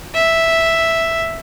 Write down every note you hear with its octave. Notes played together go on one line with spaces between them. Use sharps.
E5